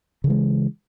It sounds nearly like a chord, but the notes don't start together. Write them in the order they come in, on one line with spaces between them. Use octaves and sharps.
C#3 E3 G#3